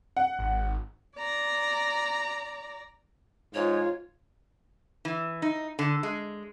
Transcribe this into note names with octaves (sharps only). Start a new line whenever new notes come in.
F#5
G#1
D5 A#5
G#2 F4 C#5
E3
D#4
D3
G#3